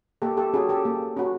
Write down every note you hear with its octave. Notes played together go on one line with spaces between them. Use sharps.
A#3 G4 A4
G4 A4
C#4 F#4 G#4
G4 A4
A#3
C#4 F#4